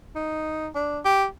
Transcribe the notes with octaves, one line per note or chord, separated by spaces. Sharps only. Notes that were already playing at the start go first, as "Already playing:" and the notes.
D#4
D4
G4